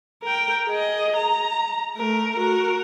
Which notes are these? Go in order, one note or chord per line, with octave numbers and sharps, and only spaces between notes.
A#4 G5
G#4 D#5
A#5
A3 A#4
F#4 A#4